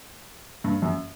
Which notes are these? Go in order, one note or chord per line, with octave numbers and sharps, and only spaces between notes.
G2
F#2